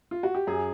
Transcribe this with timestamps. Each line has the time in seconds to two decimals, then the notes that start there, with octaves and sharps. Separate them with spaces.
0.11 F4
0.23 F#4
0.35 G4
0.47 F#2 G#4